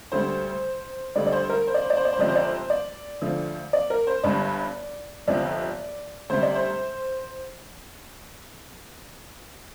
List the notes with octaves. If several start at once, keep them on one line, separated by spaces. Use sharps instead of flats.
D2 D3 G3 C5
D2 D3 G3 D5
D5
C5
A#4
C5
D5
C5
D5
C5
D5
C5
G1 F2 C3 D5
C5
D5
C5
D5
D2 D3 F3
D5
A#4
C5
G1 G2 G3 D5
G1 F2 C3 F3 D5
D2 C3 G3 C5
D5
C5